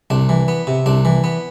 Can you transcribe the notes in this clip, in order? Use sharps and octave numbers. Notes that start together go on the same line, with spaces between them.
C2 D4
E3
B3
C3
C2 D4
E3
B3